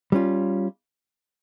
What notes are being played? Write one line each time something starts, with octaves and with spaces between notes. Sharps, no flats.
G3 C#4 F4